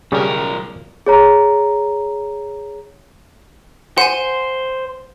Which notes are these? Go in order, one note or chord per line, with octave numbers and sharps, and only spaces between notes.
B1 C#3 G3 A#4
G#4 C#5 A#5
C5 F#5 G#5